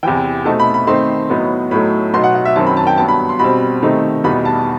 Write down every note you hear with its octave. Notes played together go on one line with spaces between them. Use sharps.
E2 C3 E3 G5
B2 A3 C4 D#4 A5
B5
B5
D#3 A3 C4 D#4 C6
A2 F#3 B3 D#4
A2 F#3 A3 D#4 B5
B2 F#3 B3 D#4 C6
F#5
F#5
E5
F#2 D#3 F#3 C4 A5
B5
A5
G5
G2 F#3 B3 A5
B5
C6
B2 G3 C4 B5
C3 D#3 A3 C4 D#4
E2 B2 G3 B3 D#4 B5
A5